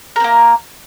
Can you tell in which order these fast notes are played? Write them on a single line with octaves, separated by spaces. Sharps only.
A#4 C4 A#3